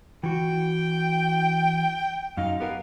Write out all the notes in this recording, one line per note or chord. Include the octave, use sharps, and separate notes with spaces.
E3 F#4 G5
F#2 D#4 F5
B3 G4 A#4 F5